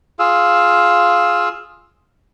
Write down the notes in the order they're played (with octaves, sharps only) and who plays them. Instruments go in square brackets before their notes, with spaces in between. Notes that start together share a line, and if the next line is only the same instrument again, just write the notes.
[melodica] F4 G#4 F5 E6